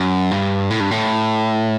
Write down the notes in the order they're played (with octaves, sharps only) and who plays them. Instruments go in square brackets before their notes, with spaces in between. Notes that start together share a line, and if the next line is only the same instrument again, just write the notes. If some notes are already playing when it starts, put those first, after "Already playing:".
Already playing: [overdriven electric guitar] F#2
G2
A2
G2
A2